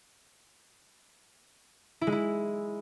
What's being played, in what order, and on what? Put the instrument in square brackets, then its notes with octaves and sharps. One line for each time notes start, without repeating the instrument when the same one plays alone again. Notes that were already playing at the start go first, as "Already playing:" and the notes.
[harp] E4
G#3
E4